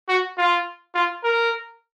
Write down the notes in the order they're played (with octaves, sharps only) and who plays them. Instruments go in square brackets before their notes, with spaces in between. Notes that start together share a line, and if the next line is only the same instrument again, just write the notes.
[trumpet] F#4
F4
F4
A#4